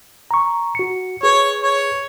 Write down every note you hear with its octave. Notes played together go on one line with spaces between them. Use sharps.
A#5 C#6
F#4 C#7
G#4 B4 C#5
C#5